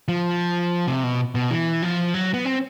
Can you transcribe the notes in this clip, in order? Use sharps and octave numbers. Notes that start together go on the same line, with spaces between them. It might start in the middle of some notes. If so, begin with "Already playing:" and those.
F3
C3
B2
B2
E3
F3
F#3
B3
C4